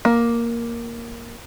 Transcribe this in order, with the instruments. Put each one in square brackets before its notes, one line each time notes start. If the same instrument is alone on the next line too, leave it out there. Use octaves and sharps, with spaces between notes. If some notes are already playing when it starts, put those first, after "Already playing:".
[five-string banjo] A#3